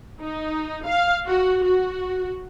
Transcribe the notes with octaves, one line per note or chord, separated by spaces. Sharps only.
D#4
F5
F#4
F#4